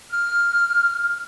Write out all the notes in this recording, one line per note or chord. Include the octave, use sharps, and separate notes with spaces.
F6